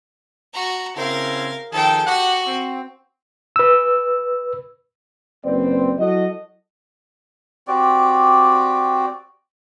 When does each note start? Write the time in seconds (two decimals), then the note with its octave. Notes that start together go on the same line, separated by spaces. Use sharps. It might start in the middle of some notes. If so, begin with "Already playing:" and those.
0.54 F#4 A#5
0.96 C#3 C4 E4 A#4 F5
1.72 D#3 F3 G#4 A4 G5
2.07 F#4 G4 F#5
2.46 C4
3.56 B4 E6
5.45 F#1 C4 B4 D5
5.99 F#3 E4 F#4 A4 D#5
7.68 C4 F#4 G4 D5